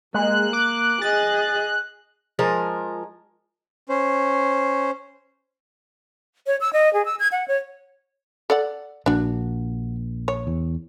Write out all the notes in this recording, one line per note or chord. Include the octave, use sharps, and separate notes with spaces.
G#3 A#3 F#6
D6
G#4 D#5 A6
F3 G#3 A#4
C#4 C5
C#5
E6
D#5
G#4
E6
G#6
F#5
C#5
A4 D5 F#5
A#1 A#3 D4 F#4
C#5
E2